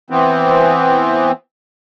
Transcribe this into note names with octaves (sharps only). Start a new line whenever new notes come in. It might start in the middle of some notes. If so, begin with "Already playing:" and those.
E3 B3 C4